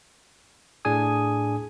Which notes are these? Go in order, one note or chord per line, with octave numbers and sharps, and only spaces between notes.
A2 D4 G#4 G#5 D#6